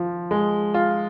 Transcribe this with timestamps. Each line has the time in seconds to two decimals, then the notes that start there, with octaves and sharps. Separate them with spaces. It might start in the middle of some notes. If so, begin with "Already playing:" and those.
Already playing: F3
0.31 G#3
0.74 F4